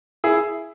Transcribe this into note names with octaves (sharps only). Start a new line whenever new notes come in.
E4 G#4